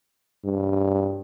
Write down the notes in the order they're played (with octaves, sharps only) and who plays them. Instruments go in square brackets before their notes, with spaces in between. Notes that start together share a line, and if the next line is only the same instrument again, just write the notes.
[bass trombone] G2